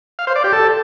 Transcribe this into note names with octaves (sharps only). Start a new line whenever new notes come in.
F5
C5
D5
G4
A4